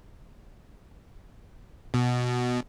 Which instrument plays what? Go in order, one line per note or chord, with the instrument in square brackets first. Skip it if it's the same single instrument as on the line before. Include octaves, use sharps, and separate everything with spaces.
[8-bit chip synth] B2